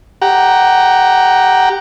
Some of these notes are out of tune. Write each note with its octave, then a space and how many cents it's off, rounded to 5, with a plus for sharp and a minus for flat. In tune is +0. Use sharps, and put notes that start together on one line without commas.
G4 +0 F#5 +20 A#5 +0